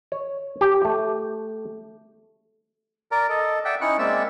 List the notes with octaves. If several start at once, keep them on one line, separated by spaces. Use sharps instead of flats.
C#5
G4
A3
A#4 D5 A#5
A4 D#5
D5 E5 F#5 G5
C#4 D#4 E4 C#6 F#6
G#3 A#3 C4 D5 E5 E6